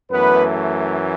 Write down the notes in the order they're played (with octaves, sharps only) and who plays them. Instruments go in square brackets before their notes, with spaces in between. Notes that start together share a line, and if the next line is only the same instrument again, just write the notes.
[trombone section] F#2 E3 A3 B3 B4